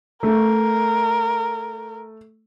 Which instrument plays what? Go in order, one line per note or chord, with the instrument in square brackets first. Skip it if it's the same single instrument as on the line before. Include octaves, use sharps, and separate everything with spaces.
[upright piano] A3 [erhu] A#4